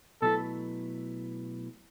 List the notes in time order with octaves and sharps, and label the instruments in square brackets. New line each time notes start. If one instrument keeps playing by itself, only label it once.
[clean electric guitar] B2 F#3 A3 E4 B4 [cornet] A4